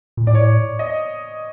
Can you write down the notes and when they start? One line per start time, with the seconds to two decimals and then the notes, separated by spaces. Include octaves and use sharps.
0.17 A#2
0.27 A2 D5
0.35 C#5
0.42 D5
0.79 D#5